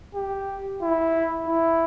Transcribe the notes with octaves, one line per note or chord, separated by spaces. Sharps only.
G4
E4
E4